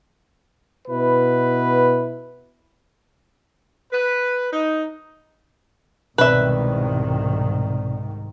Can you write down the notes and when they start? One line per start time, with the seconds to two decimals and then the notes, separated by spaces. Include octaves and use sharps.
0.88 B2 E4 B4
3.92 B4
4.52 D#4
6.18 C2 G#2 B2 D#3 C4 B4 D5 E5